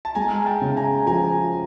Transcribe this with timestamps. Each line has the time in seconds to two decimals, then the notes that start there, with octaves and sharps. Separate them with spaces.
0.05 A5
0.15 G#3 G#5 A#5
0.46 G5 A5
0.62 C#3
0.76 G#5 A#5
1.07 F3 G#5 A#5